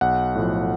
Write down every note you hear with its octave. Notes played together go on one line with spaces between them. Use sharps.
B1 F#5
A2 F3